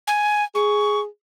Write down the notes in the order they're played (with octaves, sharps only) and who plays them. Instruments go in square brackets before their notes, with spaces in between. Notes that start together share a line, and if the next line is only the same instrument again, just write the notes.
[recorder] G#5
[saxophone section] G#4 [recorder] C#6